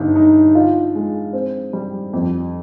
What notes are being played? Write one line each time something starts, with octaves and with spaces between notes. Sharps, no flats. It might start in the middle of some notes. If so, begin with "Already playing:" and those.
Already playing: G1 D#4
D#4
F4
G#3
C4
G3
F2